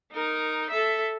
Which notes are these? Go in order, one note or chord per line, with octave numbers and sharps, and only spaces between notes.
D#4 A#4
A4 E5